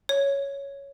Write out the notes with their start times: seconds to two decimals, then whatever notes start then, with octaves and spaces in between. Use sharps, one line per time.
0.09 C#5